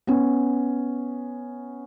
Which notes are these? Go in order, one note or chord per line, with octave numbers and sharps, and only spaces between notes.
B3 C#4